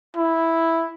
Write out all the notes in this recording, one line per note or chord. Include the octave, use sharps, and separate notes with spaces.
E4